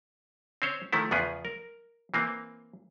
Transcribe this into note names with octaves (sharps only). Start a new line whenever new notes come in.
C4 C#4 C5 C#5
D#3 F3 A3 E4
E2 C#3 F3 B3 G#4
A#4
E3 A#3 C4